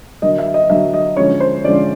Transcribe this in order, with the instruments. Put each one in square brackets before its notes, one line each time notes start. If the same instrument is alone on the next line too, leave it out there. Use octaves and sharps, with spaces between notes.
[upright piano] D3 F#3 A#3 D#5
E5
D#5
D3 F#3 A#3 E5
D#5
D3 F3 G#3 C#4 C#5
C5
D3 F3 G#3 C#4 D5